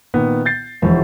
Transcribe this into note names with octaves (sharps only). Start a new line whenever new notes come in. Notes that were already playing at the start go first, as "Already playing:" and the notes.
A#2 D#3 B3
G6 A6 C7
E1 F2